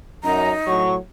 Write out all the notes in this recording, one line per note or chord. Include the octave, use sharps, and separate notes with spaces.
F#2 D#4 A#5
A2 F#3 C#6